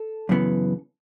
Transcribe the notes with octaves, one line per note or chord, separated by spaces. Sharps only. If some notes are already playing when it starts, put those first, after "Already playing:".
Already playing: A4
F#2 C#3 E3 B3